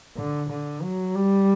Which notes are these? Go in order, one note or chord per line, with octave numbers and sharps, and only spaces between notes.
D3
D3
F#3
G3